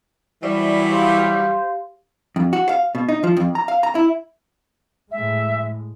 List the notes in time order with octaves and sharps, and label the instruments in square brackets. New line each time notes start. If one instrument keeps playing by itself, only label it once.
[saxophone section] E3 F#3 G3 [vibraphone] C5 D5 E5
[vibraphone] G4 F5 [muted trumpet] C5
[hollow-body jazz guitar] F2
F#4
F5
B2
D#4
F3
F2
A#5
F5
A#5
E4
[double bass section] A2 G#3 [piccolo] E5